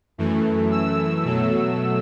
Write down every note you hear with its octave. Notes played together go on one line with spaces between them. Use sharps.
F#2 E3 A3
E6
B2 F#3 A3